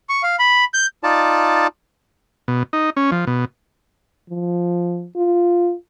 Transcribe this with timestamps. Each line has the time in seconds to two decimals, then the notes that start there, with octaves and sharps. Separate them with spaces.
0.09 C#6
0.23 F5
0.39 B5
0.74 G6
1.03 D#4 F4 D5 A5
2.48 B2
2.73 D#4
2.97 C#4
3.12 F3
3.27 B2
4.30 F3
5.16 F4